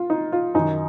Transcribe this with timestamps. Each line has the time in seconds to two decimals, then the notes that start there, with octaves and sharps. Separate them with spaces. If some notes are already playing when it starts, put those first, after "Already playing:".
Already playing: F4
0.10 D#4
0.32 F4
0.54 F#2 D#3 D#4